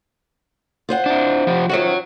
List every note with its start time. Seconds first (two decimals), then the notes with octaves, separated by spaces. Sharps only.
0.89 F4 C5 F#5
1.06 D4 E4
1.47 F3 G4
1.70 F#2 D#3 F3 F#4 C#5